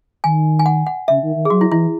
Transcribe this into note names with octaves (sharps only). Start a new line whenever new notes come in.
D#3 G#5
G#5
F#5
F#5
C#3 E5
D#3
D#3
G#4
F#3 F#4
E4
E3 E4